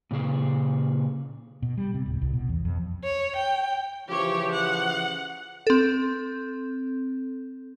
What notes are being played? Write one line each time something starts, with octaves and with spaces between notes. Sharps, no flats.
A#2 C#3 G#4
B2
G3
C3
D1
C2
B2
E2
F2
C#5
G5
C#3 E3 F3 G4 C#5
F#5
C4 A4